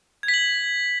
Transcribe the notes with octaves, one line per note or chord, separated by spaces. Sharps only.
G#6
B6
F#7